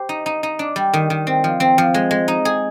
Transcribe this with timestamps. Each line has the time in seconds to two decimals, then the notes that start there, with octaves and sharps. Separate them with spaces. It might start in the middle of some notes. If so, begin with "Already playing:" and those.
Already playing: G4 C5
0.09 D#4
0.26 D#4
0.43 D#4
0.59 D4
0.76 G3
0.94 D#3
1.10 D#3
1.27 C4
1.44 F3
1.60 C4
1.78 F3
1.94 G#3
2.11 G#3
2.28 D#4
2.45 G#4